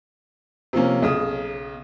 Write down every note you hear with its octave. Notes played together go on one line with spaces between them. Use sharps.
C3 F3 A#3 C#4
B1 C#3 D#6